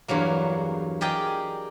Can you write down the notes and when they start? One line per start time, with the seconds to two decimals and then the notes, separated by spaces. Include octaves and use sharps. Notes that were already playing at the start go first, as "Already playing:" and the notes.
0.08 E2 G2 F#3 A#3
1.01 G4 G#4 A#4 D5 D#5 G5